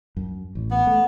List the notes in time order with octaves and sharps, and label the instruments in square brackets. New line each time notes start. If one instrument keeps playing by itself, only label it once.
[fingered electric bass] F#2
A1
[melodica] B3
[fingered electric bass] A3